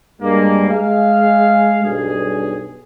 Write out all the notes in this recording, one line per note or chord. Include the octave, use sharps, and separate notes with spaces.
G2 G#3 A#3
G#3 G#4 F5
B1 G2 G#4